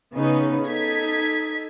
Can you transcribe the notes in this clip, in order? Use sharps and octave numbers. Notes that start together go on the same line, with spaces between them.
C#3 B3 C#4 D#4 B4
D#4 A4 G#6 B6